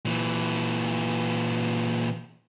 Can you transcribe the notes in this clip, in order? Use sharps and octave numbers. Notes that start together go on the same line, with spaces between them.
A#2 E3